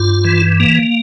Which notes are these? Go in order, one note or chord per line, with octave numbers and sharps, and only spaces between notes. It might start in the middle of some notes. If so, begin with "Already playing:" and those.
Already playing: G2 F4
E3
A#3